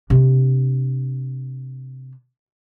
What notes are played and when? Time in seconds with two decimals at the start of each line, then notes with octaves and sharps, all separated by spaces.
0.10 C3 D4